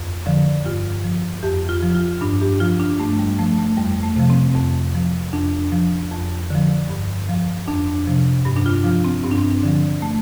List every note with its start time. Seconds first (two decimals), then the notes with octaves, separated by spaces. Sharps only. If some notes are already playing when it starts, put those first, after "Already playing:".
Already playing: F2
0.26 D3 F3
0.65 G2 F4
1.04 F3
1.43 F2 G4
1.69 F4
1.83 F3
1.95 F4
2.21 G2 D4
2.41 G4
2.60 F3 F4
2.80 D4
2.99 G2 A3
3.19 G3
3.39 F3 A3
3.58 A3
3.77 F2 G3
4.03 A3
4.16 C3 F3
4.30 C4
4.55 F2
4.95 F3
5.33 F2 D4
5.72 F3
6.11 F2
6.50 D3 F3
6.90 G2
7.29 F3
7.67 F2 D4
8.07 C3 F3
8.45 G2
8.56 D4
8.66 F4
8.84 F3 F4
9.04 C4
9.24 G2 C4
9.31 D4
9.38 C4
9.63 D3 F3
10.02 A3